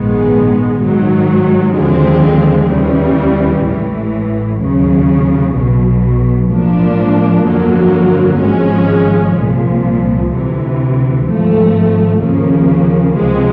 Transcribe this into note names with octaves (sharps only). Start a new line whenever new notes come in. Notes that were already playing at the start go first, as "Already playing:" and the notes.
Already playing: A#1 G#2 D#3 G#3 B3
G#2 D#3 F#3
D#2 D3 F3 G#3 C4
D#2 C#3 E3 G3
A1 A2 E3
D#2 C#3 F#3
B1 B2 F#3
A2 F3 A#3 D4
G1 F2 D3 F#3 A#3
G#1 G#2 F3 G#3 C#4
C2 A#2 F3
D2 C3 E3
G#1 G#2 F3 A3
D#2 C#3 F3 A#3
C#2 C3 F3 G#3